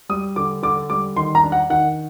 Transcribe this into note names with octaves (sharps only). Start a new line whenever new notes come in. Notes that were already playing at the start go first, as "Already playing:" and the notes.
G3 D#6
D3 D6
D3 D6
G3 D6
D#3 C6
A#5
D4
F#5
D#3 F#5